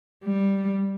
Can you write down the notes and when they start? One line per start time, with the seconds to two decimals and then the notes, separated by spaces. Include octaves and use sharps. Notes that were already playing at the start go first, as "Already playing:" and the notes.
0.24 G3